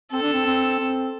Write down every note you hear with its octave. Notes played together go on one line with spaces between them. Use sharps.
C4 A4
D4
C4
C4
C4